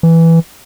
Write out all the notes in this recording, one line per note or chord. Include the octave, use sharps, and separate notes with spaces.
E3